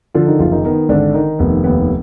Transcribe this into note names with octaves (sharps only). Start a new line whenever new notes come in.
D3 F3 F4
D#3 D#4
F#1 F3 F4
D#3 D#4
D#3 B3
G#1 D3 D4
D#3 D#4
F1 B3
D#2 B3